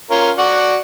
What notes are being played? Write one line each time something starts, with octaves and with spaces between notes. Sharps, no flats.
C#4 F4 A#4
F#4 D5 F#5